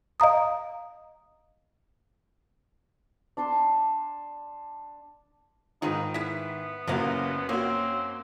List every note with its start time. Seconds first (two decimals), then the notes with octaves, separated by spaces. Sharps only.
0.20 D#5 F5 A#5 D#6
3.37 D4 A5 C6 D6
5.82 G#2 D#3 D#4 F4 G#4 B4
6.14 G#3 B3 E4 B6
6.88 F#1 F#2 C3 E3 A#3 F#4 F5
7.49 A#3 C4 C#4 F#4